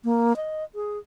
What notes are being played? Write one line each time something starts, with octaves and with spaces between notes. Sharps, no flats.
A#3
D#5
G#4